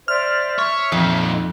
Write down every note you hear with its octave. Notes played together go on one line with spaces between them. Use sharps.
C5 D5 E5 F6
C#5 E5
F2 A#2 D#4